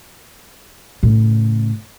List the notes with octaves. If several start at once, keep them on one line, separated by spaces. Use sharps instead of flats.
A2 C#3